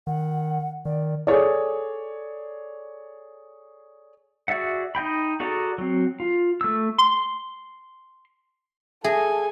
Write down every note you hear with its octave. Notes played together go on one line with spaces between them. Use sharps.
D#3 F#5
D#3 D5
G#4 A4 C#5 D5
F#4 G#4 D5 E5 F#5
D#4 D#5 G5 B5
F#4 G#4 A4 D5 A#5
F#3 C4
F4
A3 E6
C6
G#4 A4 E5 G#5